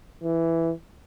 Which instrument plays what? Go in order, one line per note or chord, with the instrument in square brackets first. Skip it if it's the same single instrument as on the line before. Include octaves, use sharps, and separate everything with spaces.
[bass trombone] E3